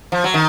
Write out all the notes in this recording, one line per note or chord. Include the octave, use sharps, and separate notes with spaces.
F3
F#3
D#3